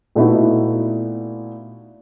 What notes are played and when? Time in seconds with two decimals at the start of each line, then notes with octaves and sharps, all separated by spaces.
0.15 A#2 A3 B3 D#4 E4 F#4